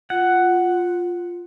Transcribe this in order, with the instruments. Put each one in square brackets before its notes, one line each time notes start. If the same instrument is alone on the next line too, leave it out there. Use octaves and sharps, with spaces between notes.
[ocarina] F4 [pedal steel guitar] F#5